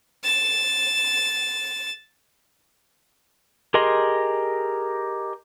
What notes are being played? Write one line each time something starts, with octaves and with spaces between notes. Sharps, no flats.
A6 E7
G4 G#4 A#4 D#5 C6